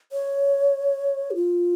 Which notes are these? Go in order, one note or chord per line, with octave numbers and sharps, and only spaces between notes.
C#5
G4
F4